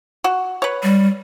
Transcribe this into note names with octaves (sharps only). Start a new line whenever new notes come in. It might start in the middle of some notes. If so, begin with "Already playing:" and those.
F#4
B4 C#5
G3